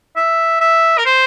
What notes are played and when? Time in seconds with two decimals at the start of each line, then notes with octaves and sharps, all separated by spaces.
0.16 E5
0.61 E5
0.98 A#4
1.06 C5